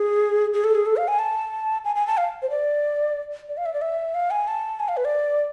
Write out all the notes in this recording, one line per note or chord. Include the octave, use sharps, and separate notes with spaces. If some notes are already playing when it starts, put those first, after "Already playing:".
Already playing: G#4
G#4
A4
G#4
A4
F5
G#5
A5
G#5
G#5
A5
F5
C5
D5
D5
F5
E5
D5
E5
F5
G#5
A5
G#5
F5
B4
D5